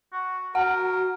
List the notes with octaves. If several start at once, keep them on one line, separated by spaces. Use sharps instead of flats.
F#4
F#4 A#4 F#5